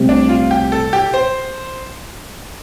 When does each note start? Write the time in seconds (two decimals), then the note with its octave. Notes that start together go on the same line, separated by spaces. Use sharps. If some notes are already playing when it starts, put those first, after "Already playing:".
Already playing: C2 C3 A3 C4
0.09 D4
0.29 F4
0.51 G4
0.72 A4
0.93 G4
1.14 C5